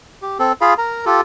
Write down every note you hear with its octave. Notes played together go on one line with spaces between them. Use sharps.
G4
C4 A4
F4 G#4 F5 B5
A#4 A#5
F4 G4 A4